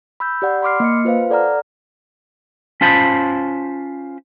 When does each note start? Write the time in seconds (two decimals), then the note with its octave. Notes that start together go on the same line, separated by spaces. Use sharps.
0.20 B5 E6 G6
0.42 G4 D5 F#5
0.62 B5 C6 D6 F6 C7
0.80 A#3 D#5 C#7
1.05 F4 B4 C5 F5
1.30 A4 D5 F#5 A#5 F6
2.81 C#4 F4 C5 A5 B5